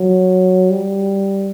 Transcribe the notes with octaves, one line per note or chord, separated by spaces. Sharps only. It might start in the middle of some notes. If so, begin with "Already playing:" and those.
Already playing: F#3
G3